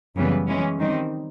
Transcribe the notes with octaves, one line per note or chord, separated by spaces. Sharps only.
F#2 C#3 E3 G3 B3
E3 G#3 C#4
D#3 G3 C4 D#4